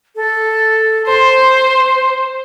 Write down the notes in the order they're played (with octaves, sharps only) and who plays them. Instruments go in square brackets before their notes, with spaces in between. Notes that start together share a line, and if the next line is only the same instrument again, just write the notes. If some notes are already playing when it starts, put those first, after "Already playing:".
[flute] A4
[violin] C5 [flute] C6